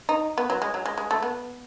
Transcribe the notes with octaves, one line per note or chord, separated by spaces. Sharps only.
D#4
B3
F#3
G#3
F#3
G#3
G#3
A3
B3